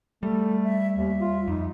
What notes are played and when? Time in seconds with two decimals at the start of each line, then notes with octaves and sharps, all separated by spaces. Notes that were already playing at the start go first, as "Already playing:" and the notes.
0.23 G3 A3 A4
0.63 E5
0.96 D#2 E5
1.21 F4
1.48 F2 D#4